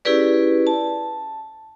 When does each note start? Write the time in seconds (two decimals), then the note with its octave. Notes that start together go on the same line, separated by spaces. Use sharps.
0.05 C#4 E4 G4 G#4 B4 D5
0.67 A5